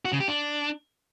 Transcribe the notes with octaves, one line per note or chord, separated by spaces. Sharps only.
F#4
C#3
G4
D4